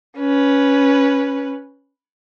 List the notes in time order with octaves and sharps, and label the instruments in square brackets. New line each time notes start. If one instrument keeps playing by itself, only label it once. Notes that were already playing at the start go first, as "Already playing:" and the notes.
[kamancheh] C#4 B4